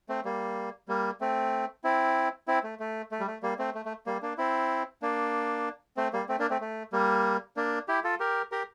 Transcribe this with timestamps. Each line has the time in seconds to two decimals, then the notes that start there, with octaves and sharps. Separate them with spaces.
0.09 A3 C4
0.25 G3 A#3
0.88 G3 A#3
1.21 A3 C4
1.84 C4 E4
2.48 C4 E4
2.64 A3
2.80 A3
3.12 A3
3.20 G3
3.27 A3
3.43 G3 A#3
3.59 A3 C4
3.74 A3
3.85 A3
4.06 G3 A#3
4.22 A#3 D4
4.38 C4 E4
5.02 A#3 D4
5.97 A3 C4
6.13 G3 A#3
6.29 A3 C4
6.39 A#3 D4
6.50 A3 C4
6.61 A3
6.93 G3 A#3
7.57 A#3 D4
7.88 E4 G4
8.04 F4 A4
8.20 G4 A#4
8.52 G4 A#4